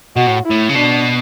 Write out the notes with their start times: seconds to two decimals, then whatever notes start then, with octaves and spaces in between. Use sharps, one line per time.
0.16 B2 F#4
0.27 A2
0.45 E4
0.50 A2
0.69 C#3
0.75 B2 D4